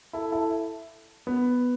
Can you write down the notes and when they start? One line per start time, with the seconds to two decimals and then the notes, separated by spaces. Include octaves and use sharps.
0.13 E4 A4
0.32 E4 A4
1.27 B3